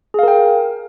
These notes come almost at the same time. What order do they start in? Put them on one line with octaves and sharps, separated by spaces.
G#4 F5 A#4 G5